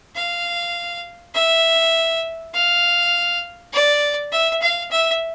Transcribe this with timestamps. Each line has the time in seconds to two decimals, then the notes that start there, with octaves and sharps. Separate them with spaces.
0.16 F5
1.35 E5
2.54 F5
3.73 D5
4.32 E5
4.62 F5
4.91 E5